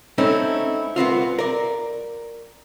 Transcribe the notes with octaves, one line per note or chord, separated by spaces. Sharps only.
A3 C4 C#4 D#4 E4
C2 B3 C4 F4
A#4 D5